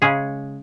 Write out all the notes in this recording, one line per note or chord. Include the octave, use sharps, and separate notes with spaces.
C#3 G#3 C#4 G#4